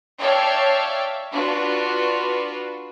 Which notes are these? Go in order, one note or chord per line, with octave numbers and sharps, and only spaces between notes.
C#5 D5 E5 F5 G5 A5
D4 F4 F#4 B4